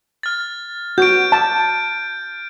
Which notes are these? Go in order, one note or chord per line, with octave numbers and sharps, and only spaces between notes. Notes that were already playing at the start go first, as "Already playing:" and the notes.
F6 A6
F#4 G6 D7
A5